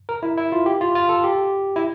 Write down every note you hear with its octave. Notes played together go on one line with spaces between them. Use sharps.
A#4
E4
E4
F4
G4
F4
F4
A4
G4
E4